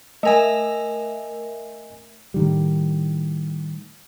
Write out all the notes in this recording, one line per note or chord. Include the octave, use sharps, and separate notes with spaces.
A3 A#4 D#5 E5 G#5
A2 D#3 G3